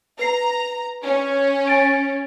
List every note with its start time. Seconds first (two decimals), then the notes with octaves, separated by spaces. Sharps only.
0.19 B4 A#5 C7
1.03 C#4
1.67 G#5 A6 D7